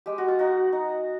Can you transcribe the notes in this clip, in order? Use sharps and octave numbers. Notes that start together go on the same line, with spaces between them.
G#3 G4
F#4
F4
D#4 F#4
D#4